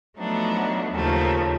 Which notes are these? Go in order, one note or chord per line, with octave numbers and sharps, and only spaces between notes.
F3 F#3 A3 B3 D4 D#4
D#2 C#3 F3 A3 A#3